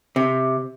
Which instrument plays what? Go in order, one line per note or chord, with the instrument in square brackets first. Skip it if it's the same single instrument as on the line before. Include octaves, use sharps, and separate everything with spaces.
[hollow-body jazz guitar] C3